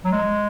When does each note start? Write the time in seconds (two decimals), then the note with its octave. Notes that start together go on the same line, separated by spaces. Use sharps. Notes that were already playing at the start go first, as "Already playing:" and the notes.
0.05 F#3
0.11 G#3